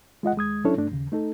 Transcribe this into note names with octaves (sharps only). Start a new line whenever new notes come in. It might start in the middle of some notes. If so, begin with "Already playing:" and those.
G#3 F4 D#5 F#5
D#2 G#3 D#6 G#6
F#3 C#4 D4 E4 A4 C#5
G2 A3 D4
D#2 C#3
A3 D#4 A4